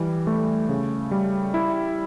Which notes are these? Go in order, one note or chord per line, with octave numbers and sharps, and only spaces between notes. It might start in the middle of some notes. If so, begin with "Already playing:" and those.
Already playing: E3 G3
A3
C#3
G3
E4